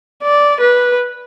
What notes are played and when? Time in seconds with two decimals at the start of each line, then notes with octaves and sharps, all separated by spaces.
0.23 D5
0.61 B4